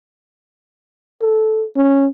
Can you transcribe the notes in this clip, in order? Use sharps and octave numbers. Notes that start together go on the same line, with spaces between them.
A4
C#4